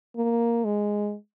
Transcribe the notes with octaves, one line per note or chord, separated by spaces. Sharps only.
A#3
G#3